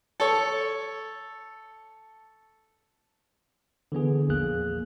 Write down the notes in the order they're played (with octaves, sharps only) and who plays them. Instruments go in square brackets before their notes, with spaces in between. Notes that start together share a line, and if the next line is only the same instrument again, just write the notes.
[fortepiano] A4 C#5
[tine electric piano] D3 E3 B3 G#4
A#1 E2 A#3 G#4 F#6